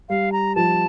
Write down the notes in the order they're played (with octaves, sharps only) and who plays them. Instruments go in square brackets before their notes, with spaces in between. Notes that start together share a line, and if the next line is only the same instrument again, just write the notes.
[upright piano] G3 [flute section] F5
[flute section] A#5
[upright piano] F3 [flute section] A5